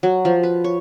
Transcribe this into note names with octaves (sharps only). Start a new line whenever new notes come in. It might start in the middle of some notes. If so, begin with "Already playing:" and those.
F#3
F3
B4
C#5